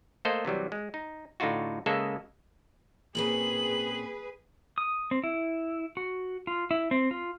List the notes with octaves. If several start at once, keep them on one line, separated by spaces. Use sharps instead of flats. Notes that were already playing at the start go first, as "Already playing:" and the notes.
A3 A#3 A4 C5 D#5
C3 E3 F#3 G3
G#3
D#4
A2 D3 D#4 F4 F#4
C#3 G#3 A#3 G#4 A4 E5
A#2 C4 C#4 G#4 B4 F#7
D#6
C4
E4
F#4
F4
E4
C4
F4